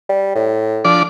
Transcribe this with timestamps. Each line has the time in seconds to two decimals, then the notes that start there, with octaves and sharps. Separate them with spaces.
0.09 G3
0.35 A2
0.85 F3 D4 D5